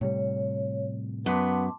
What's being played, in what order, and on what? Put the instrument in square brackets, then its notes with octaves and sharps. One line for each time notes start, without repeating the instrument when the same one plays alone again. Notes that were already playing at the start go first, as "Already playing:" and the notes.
[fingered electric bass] A2 C3 G3 [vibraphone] C#5
[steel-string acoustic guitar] F#2 [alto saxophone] B3 [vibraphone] A5 C6 D6